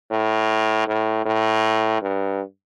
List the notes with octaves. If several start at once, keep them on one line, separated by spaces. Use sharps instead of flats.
A2
A2
A2
G2